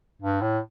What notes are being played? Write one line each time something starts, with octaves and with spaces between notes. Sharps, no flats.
G2
A2